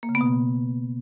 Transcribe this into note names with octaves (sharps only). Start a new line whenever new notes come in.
A#3
C#3
B3
B2